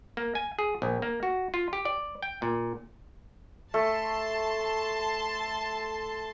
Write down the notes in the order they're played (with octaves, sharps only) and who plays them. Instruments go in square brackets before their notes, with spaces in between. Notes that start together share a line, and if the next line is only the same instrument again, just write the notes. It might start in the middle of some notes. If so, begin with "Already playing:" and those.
[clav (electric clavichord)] A#3
G#5
G#4
A#1
A#3
F#4
F4
G4
D5
G5
A#2
[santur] A3 [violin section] A5 C6